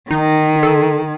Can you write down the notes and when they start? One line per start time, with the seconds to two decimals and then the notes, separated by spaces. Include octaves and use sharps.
0.11 D#3 D#4
0.63 A4